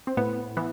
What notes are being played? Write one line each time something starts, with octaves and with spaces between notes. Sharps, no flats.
C4
A2 B3
E3 B3